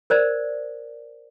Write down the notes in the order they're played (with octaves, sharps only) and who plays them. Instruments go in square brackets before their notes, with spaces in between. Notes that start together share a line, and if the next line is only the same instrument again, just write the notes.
[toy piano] A#4 C5 D5